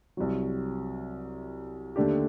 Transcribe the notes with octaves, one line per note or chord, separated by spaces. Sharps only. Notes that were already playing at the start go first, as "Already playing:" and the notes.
C2 C3 F#3
D#2 D3 A3 D4 G4